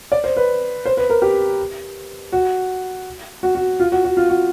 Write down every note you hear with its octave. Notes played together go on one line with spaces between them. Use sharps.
D5
C5
B4
C5
B4
A#4
G4
F#4
F#4
F#4
F4
F#4
F#4
F4
F#4